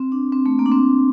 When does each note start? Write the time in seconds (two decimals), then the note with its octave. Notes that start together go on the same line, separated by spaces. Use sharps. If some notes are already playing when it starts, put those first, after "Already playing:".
Already playing: C4
0.12 D4
0.32 C4
0.46 A3
0.59 A#3
0.66 D4
0.72 C4